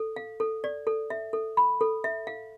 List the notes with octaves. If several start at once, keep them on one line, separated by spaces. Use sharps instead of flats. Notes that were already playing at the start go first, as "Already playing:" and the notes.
Already playing: A4
F5
A4
D5
A4
E5
A4
B5
A4
E5
F5